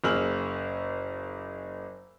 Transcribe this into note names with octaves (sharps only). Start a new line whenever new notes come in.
F#1 A#3 G#4 E6 F6 F#7